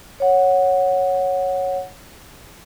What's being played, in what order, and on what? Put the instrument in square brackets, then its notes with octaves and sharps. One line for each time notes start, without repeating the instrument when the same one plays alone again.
[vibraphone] C#5 F#5